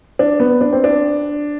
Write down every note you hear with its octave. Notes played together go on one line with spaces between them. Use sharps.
D4
B3
D4
C4
D4